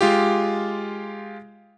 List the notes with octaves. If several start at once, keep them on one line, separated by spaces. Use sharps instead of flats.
G#3 F4 G4